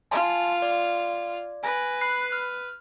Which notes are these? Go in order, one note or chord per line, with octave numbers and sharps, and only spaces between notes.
F4 G#5 A5 C6
D5
B4 G#5 A#6
B5 F#6 C7
F6